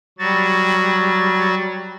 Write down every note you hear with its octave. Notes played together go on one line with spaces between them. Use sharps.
F#3 G3 F#4 A6